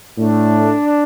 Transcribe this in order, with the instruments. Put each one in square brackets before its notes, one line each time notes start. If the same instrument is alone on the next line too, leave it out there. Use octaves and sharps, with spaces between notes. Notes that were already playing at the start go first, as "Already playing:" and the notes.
[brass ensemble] A2 A3 D4